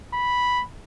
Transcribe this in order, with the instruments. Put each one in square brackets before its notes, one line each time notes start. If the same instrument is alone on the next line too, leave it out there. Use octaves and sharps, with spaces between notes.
[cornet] B5